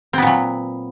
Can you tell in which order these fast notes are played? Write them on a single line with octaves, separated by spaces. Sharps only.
C4 B3 A#2 F#3